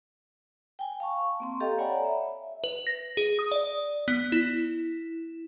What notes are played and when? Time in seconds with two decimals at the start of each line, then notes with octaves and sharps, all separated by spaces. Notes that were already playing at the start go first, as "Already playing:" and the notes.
0.79 G5 G#5
1.00 F5 A5 C#6
1.40 A#3 C4 C6
1.60 G4 A4 D#5 F5 G5 A#5
1.78 C#5 D5 F#5 G#5 A#5 B5
2.04 E5
2.64 B4
2.87 A#6
3.17 G#4
3.39 D#6
3.52 D5
4.08 B3
4.32 E4